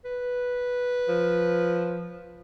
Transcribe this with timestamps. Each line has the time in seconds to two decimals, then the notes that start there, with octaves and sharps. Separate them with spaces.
0.05 B4
1.08 F3